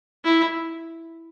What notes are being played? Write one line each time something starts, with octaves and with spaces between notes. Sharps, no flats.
E4